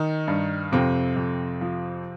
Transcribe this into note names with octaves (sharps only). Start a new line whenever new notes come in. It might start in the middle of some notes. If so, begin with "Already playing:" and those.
Already playing: D#3 D#4
G2
F2 C3 C4
F2
F3